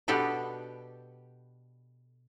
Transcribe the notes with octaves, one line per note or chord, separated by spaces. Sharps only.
B2 B3 D4 G4 A4 D5